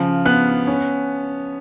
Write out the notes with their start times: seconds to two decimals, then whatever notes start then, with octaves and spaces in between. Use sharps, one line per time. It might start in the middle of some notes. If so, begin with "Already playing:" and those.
Already playing: C#3 F3
0.26 B3 F#6
0.67 C#4